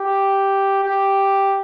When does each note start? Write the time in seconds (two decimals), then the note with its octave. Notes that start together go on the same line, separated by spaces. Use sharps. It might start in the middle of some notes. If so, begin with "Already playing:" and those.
Already playing: G4
0.84 G4